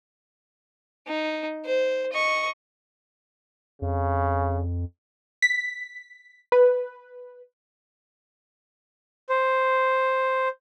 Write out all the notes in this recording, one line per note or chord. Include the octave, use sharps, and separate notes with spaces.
D#4
C5
D#5 C#6
F2 C#3
B6
B4
C5